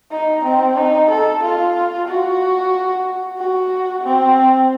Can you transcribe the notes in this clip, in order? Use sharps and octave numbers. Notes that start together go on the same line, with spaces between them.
D#4
C4
D#4
A4
F4
F#4
F#4
C4